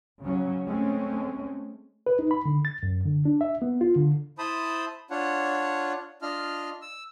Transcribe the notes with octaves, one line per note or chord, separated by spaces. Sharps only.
C#3 F#3 C#4
G#3 A3 C4 C#4
B4
D#4
B5
D3
A6
F#2
D3
D4
E5
B3
F4
D3
E4 C5 A5 B5 D#6
D4 F4 C#5 F#5
D4 F4 D#5 F6
E6